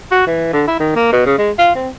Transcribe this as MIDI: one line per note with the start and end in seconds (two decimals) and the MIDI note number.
0.11 0.23 66
0.27 0.50 52
0.53 0.64 50
0.67 0.79 64
0.80 0.92 51
0.96 1.08 58
1.12 1.21 47
1.26 1.38 49
1.38 1.51 56
1.58 1.72 65
1.75 1.89 60